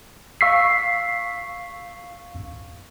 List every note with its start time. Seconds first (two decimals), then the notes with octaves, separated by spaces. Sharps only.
0.41 F5 C#6 E6 B6 C7